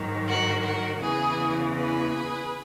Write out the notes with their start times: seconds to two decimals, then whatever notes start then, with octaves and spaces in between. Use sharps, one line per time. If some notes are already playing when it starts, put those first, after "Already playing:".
Already playing: G#2 D#3 F#3
0.26 F#4 A#4
0.64 F#4 A#4
1.01 E2 C#3 E3 G#4 B4
1.75 G#4 B4